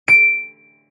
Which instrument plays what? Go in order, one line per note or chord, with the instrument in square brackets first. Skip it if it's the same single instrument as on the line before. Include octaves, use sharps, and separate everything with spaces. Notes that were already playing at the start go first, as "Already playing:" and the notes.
[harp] D7